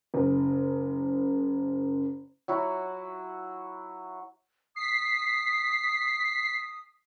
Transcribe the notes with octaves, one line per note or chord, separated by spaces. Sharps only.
F#1 C#3
F#3 E4 F#4
D#6 B6 C7